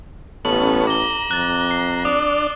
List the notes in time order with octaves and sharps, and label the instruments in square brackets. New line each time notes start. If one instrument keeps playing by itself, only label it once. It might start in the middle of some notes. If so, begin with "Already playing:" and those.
[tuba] A1 [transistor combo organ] B3 C#4 A4 [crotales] F#7
[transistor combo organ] A#5 [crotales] D6 G7
[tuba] F2 [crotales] F#6 A6
[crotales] F#6 C7
[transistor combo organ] D4 D5 [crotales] D#6